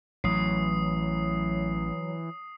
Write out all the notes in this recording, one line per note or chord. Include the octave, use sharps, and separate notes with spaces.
A1 E3 F#3 D#6 C7